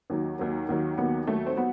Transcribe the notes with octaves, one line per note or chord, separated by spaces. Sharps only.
D#2 D#3 F#3
D#2 D#3 F#3
D#2 D#3 F#3
D#2 D#3 F#3 B3
D#2 D#3 F#3 A3
C4
F#3 B3